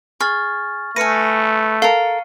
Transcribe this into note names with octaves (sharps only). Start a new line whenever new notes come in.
G#4 C#6 F6 A6
A3 B4 G#5 F6 A#6 C#7 D#7
A4 A#4 F5